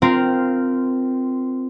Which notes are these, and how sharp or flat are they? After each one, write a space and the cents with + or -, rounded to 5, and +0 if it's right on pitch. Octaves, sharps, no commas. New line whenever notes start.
C4 -15 F4 +0 A#4 -10